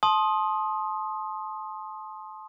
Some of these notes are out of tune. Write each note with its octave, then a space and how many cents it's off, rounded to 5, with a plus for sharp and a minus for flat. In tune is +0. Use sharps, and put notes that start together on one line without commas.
A5 -25 C6 +20 D#6 +0